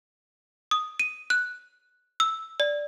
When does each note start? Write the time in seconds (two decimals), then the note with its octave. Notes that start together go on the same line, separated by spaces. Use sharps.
0.71 D#6
0.99 D#7
1.30 F#6
2.20 E6
2.60 D5